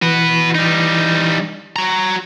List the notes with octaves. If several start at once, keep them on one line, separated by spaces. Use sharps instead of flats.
E3 F#4 B4
G3 D#4
F#4 A#5